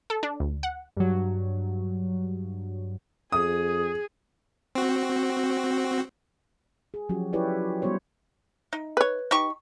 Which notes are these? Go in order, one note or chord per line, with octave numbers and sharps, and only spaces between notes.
A4
D4
D2
F#5
G2 F#3
F2 G#4 D#6
C4 F#4
G#4
F3 F#3 C#4 F#4 G4
E4 F4 G4 B4 C#5 D5
G3 B3 F#4 C5 C#5
D#4
B4 C#5
D#4 G4 C#6